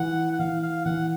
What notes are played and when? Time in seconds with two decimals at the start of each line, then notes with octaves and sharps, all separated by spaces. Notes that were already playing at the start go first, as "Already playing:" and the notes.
Already playing: E3 F#5
0.33 F#5
0.39 E3 F5
0.63 F5
0.85 E3 F#5